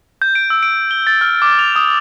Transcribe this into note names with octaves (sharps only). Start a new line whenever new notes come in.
G6
D7
E6
D7
G7
A6
F6
D6
F7
D#6